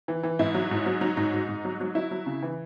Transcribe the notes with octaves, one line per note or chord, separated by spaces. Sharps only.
E3
E3
G#2 E4
F#3
G#2
F#3
F#3 D#4
G#2 D#4
G#2
G#2
F#3
F#3
F#3 E4
F#3
C#3
E3